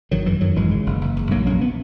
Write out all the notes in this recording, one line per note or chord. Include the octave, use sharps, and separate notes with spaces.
G#1 D#3 F#3
F#2 E3
F#2 D#3 F#3
G#1 E3 G#3
C#3
F#1
F#1
F#1
A#1 F#3 A#3
A#1 A#3 C#4
B3